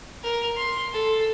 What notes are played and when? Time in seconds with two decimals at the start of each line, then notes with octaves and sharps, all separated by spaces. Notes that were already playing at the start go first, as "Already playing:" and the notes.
0.23 A#4
0.57 C6
0.93 A4